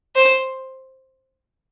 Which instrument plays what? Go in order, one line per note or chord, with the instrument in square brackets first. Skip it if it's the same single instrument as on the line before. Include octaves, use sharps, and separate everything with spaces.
[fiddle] C5